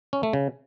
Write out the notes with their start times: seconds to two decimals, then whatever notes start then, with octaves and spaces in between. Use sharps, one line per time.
0.13 C#4
0.23 A3
0.33 C#3